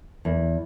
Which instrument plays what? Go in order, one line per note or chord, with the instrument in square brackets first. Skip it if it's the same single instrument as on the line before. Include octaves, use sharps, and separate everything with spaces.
[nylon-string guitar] E2